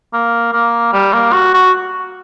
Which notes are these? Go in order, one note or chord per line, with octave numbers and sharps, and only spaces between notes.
A#3
A#3
G3
A#3
F#4
F#4